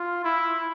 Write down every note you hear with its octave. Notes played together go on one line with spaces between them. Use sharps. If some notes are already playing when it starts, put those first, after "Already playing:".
Already playing: F4
E4